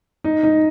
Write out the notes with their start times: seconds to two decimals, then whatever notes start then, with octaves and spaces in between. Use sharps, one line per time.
0.24 D#4
0.43 D#4